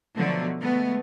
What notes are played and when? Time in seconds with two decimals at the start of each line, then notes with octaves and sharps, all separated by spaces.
0.16 B2 D3 F3 F#3 A3
0.60 G#3 A3 B3